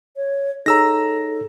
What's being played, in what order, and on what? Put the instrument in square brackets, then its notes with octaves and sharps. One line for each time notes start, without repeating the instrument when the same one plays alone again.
[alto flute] C#5
[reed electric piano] D#4 G#4 C#5 [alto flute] A4 [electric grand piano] A#5 E6 A#6